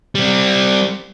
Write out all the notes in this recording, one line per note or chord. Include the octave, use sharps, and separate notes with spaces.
G3 C4